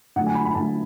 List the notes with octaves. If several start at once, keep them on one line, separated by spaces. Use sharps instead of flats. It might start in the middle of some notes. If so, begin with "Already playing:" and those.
D3 F#3 A3 F#5
G#5
B5
B5
D3 F#3 A3 A5